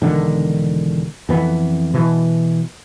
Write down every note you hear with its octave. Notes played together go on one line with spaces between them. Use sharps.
E1 D3 D#3
F2 E3 B3
B2 E3